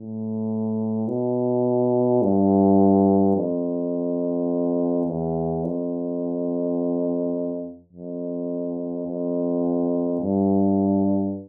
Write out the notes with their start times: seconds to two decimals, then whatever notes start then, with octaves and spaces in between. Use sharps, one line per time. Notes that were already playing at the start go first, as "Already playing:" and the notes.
Already playing: A2
1.08 B2
2.22 G2
3.36 F2
5.07 E2
5.64 F2
7.93 F2
9.07 F2
10.21 G2